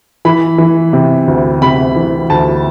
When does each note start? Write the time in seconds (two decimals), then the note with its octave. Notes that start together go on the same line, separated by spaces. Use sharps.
0.25 E3 B5
0.58 E3
0.93 C3
1.28 D2
1.61 C3 B5
1.96 E3
2.30 D2 A5